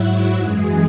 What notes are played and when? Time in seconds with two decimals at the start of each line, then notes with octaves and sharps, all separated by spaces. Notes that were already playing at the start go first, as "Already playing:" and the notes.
Already playing: G#2 F#3 E4 F#4
0.35 F#2 E3 G#3 G#4